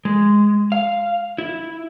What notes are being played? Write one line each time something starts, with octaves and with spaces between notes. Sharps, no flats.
G#3
F5
E4